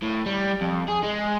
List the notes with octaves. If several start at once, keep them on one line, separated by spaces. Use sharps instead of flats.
A2
G3
F2
G#4
G#3